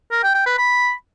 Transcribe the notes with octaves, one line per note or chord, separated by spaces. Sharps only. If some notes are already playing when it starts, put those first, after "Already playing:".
A#4
G5
G5
B4
B5